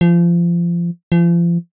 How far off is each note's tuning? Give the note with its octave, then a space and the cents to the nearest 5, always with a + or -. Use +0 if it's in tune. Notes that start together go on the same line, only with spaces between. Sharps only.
F3 -25
F3 -35